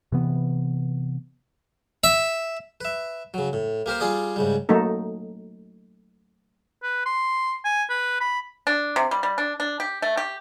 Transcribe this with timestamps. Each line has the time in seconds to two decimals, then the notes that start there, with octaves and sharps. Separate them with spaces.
0.12 C3 E3 B3
2.04 E5
2.81 B4 E5
3.34 C#3 F#3
3.53 A2
3.86 A#3 G4 A#4 C5
4.00 G3 F4 G#4 D5 D#6
4.36 G#2 C#3 G3
4.69 F#3 A3 A#3 D#4 A4
6.83 B4
7.06 C6
7.64 G#5
7.90 B4
8.21 B5
8.67 D4
8.96 C3
9.11 G3
9.23 G3
9.38 D4
9.60 D4
9.80 G4
10.02 A3
10.17 G4